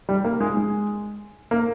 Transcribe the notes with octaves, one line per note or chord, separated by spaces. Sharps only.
G3
A#3
G#3
G#3
A#3